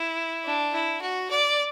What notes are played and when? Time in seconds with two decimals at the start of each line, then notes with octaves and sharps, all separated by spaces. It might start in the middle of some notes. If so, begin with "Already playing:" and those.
Already playing: E4
0.45 D4
0.72 E4
1.01 F#4
1.30 D5